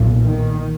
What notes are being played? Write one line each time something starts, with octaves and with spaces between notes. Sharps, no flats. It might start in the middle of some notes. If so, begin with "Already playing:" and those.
Already playing: B1 A#2
D#3